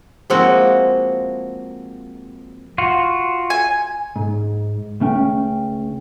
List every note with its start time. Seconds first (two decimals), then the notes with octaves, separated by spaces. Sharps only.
0.30 F3 G#3 A#3 C4 F#4
2.78 F4 F#4
3.50 G#5
4.16 G#2
5.00 C#2 A3 C#4 G5